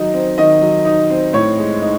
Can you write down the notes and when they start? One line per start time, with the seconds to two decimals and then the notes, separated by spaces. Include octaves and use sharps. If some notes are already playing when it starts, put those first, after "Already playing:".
Already playing: D#3 F#3 D#4 D#5
0.14 C4
0.38 D#3 D#5
0.62 F#3
0.85 D#4
1.10 C4
1.33 A2 C#5
1.58 G#3
1.82 D#4